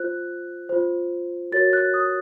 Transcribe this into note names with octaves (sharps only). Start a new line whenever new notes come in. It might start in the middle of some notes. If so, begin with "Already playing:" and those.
Already playing: F4 C5 F#6
F4 C5
F#4 A#4 C#5 A6
F#6
D#6